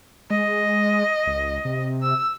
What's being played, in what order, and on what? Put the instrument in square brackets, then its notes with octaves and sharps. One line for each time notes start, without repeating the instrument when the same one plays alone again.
[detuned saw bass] G#3 [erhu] D#5
[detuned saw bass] C#2
C3
[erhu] E6